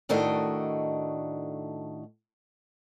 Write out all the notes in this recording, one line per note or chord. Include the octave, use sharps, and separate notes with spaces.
A2 D#3 A3 D4 F#4 D#5